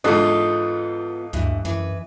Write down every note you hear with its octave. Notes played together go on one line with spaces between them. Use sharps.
E2 G#2 D3 B3 F4 D#5
D2 G2 E3
F#2 E3 B4